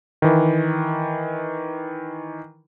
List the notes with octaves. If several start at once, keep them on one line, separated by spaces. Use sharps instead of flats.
D#3 E3